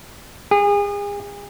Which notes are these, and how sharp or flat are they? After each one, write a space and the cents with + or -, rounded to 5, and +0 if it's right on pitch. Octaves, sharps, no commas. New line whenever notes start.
G#4 -35